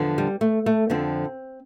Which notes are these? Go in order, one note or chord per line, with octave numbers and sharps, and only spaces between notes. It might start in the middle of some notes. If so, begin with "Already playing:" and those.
Already playing: E2 D3 F3
G3
A3
A3
F2 D3 F3 C4